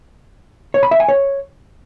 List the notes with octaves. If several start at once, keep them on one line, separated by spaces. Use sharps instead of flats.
C#5
B5
E5
G#5
C#5